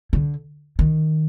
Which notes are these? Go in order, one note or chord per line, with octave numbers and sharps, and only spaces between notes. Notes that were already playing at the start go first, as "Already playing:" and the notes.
D3
D#3